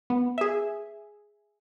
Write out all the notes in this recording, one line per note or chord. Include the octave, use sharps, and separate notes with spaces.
B3
G#4 E5